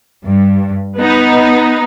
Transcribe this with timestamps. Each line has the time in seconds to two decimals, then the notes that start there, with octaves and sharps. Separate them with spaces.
0.24 G2
0.98 B3 D#4